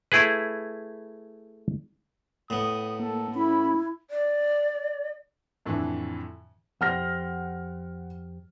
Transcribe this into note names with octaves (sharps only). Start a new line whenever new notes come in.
A3 E4 G#4 B4
A2 B3 D#6
A#3 A4
C#4 E4 B5
D5
F2 A2 D3 E3
F2 G4 C5 F#5 F6 A#6